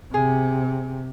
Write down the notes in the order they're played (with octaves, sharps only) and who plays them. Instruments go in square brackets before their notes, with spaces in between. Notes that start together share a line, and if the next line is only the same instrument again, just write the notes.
[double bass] C3 [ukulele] G#4